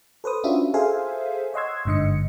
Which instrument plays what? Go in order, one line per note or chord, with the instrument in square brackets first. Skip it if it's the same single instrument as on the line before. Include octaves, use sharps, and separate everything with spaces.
[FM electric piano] A4 B4 C5 D#6
C#4 D4 F4 F#4 E5
G#4 A4 C5 E5 F5 G#5
C#5 D#5 F#5 C6 E6 G#6
G1 G#2 D3 D#5 C#7